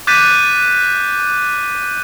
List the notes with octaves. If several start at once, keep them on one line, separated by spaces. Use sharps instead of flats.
D6 F#6 G6 A6 B6 D#7